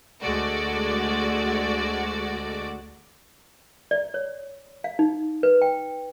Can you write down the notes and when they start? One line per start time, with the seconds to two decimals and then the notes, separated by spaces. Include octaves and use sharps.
0.22 D2 G#3 A3 F#4 D5
3.91 D5
4.14 C#5
4.84 F5
4.99 D#4
5.43 B4
5.62 G5